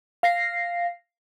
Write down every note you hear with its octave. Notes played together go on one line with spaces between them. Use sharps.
F5 A#6 C7